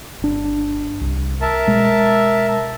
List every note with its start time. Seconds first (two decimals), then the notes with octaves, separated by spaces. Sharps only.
0.22 G1 D4
1.01 C2
1.41 A#4 E5 A5
1.67 B2 G#3